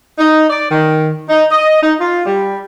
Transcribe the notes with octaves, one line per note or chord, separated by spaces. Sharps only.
D#4
D5
D#3
D#4
D#5
D#4
F4
G3